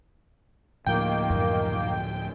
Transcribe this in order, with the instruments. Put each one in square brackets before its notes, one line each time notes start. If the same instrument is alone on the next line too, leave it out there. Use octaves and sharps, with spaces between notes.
[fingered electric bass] D2 A2 F3 [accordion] D#3 A#3 [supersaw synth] G5
[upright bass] F#2 A#2